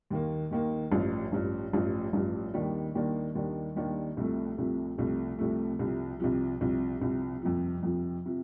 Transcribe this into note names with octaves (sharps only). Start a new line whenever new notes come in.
D#2 D#3 A#3
D#2 D#3 A#3
A1 G2 F3
A1 G2 F3
A1 G2 F3
A1 G2 F3
D#2 D#3 G3 A#3 D4
D#2 D#3 G3 A#3 D4
D#2 D#3 G3 A#3 D4
D#2 D#3 G3 A#3 D4
C2 C3 F3 A3
C2 C3 F3 A3
C2 C3 F3 A3
C2 C3 F3 A3
C2 C3 F3
C2 C3 F3
C2 C3 F3
C2 C3 F3
F2 C3 F3
F2 C3 F3
C3 F3